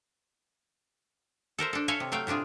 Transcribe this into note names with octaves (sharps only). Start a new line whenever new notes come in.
A4 A#4 C5 E5
D4 A4
A4 C#5 E5 F5 G#5
C3
F#3 A3 F5 G5
A2 C3 D4 F4 G#4